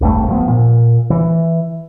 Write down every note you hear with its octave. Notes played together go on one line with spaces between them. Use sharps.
D1 G#1 G2 A3
G2 F3 B3
A#2
E3